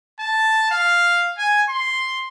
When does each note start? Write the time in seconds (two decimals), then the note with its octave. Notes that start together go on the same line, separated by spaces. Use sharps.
0.20 A5
0.71 F5
1.38 G#5
1.69 C6